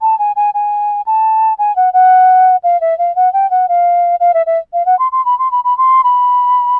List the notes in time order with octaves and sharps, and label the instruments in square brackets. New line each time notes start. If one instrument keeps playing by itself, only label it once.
[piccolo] A5
G#5
G#5
G#5
A5
G#5
F#5
F#5
F5
E5
F5
F#5
G5
F#5
F5
F5
E5
E5
F5
F#5
C6
C6
B5
C6
B5
B5
C6
B5